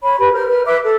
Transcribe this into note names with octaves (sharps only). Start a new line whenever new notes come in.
C#5 B5
G4 B4 B5
A#4 C5 F6
B4 F6
B4 E5 D6
A4